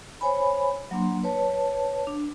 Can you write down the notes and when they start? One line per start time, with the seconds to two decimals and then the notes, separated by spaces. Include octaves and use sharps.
0.21 C5 C#5 G#5 B5
0.91 F#3 A#3 D4 C6
1.23 B4 C#5 A5
2.07 D4